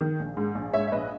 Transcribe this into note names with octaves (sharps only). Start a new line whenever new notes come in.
D#3
A#1
G#2
A#1
G#2 C#5 E5
E5
A#1 B4 D#5